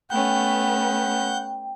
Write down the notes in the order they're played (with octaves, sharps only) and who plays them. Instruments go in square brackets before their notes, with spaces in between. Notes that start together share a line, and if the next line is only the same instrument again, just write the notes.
[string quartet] A3 B3 C#4 [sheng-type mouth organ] F#5 G6 [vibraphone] G5